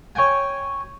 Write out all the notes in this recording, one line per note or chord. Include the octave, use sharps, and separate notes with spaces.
C#5 G5 G#5